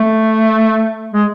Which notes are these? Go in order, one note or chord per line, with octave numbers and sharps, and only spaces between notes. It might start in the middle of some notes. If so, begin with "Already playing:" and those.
Already playing: A3
G#3